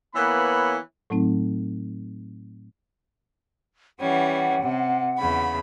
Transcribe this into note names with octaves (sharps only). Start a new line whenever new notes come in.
E3 A#3 B3 C#5 B5
A2 F#3 A3 C4 D#4
E3 G3 C#4 F#5
C3
E2 C#3 B5